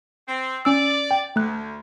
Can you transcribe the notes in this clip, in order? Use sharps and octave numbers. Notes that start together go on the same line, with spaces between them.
C4
C#4 D5 E6
G5
D2 A3 F#6